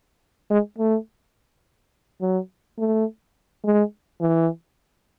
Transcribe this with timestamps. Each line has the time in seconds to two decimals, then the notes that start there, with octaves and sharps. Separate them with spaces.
0.50 G#3
0.79 A3
2.21 F#3
2.79 A3
3.65 G#3
4.21 E3